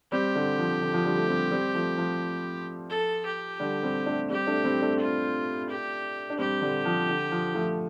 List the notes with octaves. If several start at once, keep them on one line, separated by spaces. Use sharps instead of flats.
G3 C4 G4
D3 G3
F3
D3
F3
D3 G3
A3
G3 C4
G3 C4
F3 A3
F3
A4
G4
D3 G3
G3 C4
A3 D4
G3 C4 G4
A3 D4
G3 C4
A3 D4
F4
G4
D4
G3 C4 G4
D3 G3
F3
D3
F3
F3 A3